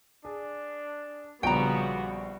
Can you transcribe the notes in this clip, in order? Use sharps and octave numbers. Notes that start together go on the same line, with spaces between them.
D4 G#4
A#1 C#3 G3 B3 F#4 G5 A#5